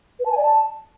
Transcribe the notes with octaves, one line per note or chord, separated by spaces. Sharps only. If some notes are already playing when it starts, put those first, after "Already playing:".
B4
A5
G#5
D5
A5